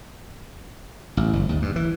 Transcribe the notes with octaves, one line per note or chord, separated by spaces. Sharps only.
A1
G1
D#2
G2
E3